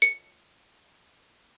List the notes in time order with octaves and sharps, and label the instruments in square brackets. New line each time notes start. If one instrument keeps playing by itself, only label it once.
[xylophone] C#7